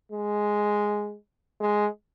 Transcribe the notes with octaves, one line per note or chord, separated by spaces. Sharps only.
G#3
G#3